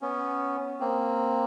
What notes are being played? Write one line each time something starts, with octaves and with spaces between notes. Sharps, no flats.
B3 C#4
A#3 C4